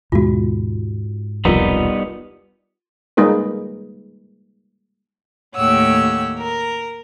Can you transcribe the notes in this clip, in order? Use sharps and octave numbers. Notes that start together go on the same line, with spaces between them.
D#2 G#2 B2 G#3 F4 F#4
E1 C2 F2 G3 B3 D#4 F4 A#4
G3 G#3 A#3 D#4 G#4 B4
D#2 A2 G4 C#5 F#5 E6
A#4